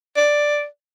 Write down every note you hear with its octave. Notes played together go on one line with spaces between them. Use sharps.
D5